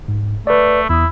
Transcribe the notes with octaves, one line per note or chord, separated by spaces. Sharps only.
G#2
A3 B4 D5
E2 E4 D#6